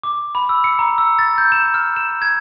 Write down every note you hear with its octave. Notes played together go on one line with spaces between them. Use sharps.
D6
B5
E6
C#7
A#5
E6
A6
G6
E7
F6
E7
G#6